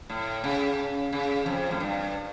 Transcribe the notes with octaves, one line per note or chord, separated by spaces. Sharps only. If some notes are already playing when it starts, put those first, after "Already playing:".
A2
C#3
C#3
F2
A2
G2